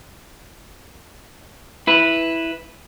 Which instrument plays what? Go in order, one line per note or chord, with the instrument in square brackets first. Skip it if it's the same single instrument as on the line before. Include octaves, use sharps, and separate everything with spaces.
[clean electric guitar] E4 B4